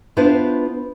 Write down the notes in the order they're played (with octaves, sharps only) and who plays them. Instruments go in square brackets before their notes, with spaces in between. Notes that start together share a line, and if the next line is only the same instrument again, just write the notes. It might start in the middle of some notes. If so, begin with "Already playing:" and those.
[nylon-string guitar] B3 D4 E4 F4 B4 C5